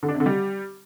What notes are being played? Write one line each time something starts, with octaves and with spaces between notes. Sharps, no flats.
D3
D4
C3
D3
G3